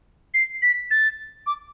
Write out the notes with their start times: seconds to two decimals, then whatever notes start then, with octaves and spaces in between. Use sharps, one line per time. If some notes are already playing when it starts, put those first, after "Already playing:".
0.34 C7
0.62 B6
0.91 A6
1.47 D6